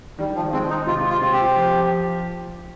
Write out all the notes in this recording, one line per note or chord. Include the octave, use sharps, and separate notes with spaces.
D#3 G3
F3
G#3 C4
D#4
C3 F4
F4
C4
G4
F3